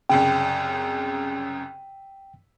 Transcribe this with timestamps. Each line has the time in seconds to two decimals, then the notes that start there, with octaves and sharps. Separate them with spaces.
0.09 C2 F#2 C#3 G5